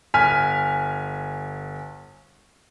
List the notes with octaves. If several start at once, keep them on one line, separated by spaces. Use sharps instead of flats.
G1 G#5 F6 B6